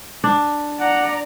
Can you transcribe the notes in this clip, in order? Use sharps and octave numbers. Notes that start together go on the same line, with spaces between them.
D4
D5 F#5 A#5